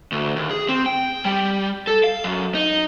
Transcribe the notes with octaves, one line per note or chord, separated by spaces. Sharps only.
D2
D#2
G#4
C4
G5
G3
A4
F5
F#2
D#4